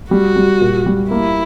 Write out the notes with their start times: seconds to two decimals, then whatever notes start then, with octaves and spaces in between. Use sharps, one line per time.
0.11 G3 F#4
0.36 G3
0.61 A#2
0.86 G3
1.11 A#3 E4